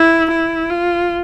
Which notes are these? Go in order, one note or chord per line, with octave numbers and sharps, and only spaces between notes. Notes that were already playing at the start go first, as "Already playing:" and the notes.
Already playing: E4
E4
F4